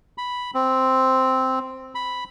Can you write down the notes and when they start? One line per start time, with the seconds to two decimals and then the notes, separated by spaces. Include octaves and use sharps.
0.18 B5
0.54 C4
1.95 B5